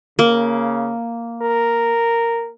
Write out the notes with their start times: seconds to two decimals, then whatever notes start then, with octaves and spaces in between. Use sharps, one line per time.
0.19 C#3 A#3
1.43 A#4